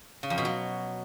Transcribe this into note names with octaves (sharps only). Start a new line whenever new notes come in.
C#3
F2
B2
F#3